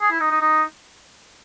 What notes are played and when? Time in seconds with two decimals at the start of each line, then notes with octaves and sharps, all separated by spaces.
0.01 G#4
0.11 E4
0.20 D#4
0.31 D#4
0.41 D#4